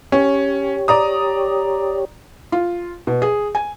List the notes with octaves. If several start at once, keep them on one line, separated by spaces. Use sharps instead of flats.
C#4 G4 C#5
D5 A#5 D#6
F4
B2
G#4
G#5